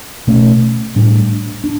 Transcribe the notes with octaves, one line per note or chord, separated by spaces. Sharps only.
B2 A3 C#4
A2 G3 D4
D4